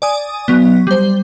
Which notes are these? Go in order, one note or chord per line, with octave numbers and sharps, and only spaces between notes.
D5 G#5 D#6
F#3 B3
G3 C5